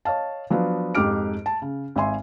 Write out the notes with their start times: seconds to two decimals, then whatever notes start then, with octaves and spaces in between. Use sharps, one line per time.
0.05 C#5 D#5 F5 A5
0.50 F3 F#3 B3 D4 F4
0.95 F2 G#2 G4 D6 F6 D7
1.46 A5
1.62 C#3
1.96 G#1 E5 G#5 C6